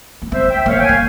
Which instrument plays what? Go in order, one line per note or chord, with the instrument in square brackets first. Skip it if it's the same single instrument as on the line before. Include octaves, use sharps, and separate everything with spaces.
[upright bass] A#3
[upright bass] C4 [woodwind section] C5 E5
[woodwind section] E5 G5
[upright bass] A#3 [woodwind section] C#5 F5
[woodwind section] G5
F5 G#5
[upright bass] A#3